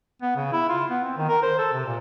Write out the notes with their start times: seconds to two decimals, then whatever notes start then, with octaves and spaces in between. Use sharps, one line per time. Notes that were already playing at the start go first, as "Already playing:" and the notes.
0.22 B3
0.36 C#3
0.52 E4
0.69 F4
0.90 B3
1.03 C4
1.17 D#3
1.28 A#4
1.42 C5
1.58 A4
1.73 C3
1.86 A#2